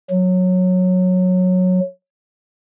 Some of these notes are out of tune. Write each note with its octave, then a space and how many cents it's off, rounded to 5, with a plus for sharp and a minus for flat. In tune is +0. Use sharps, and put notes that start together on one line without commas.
F#3 -15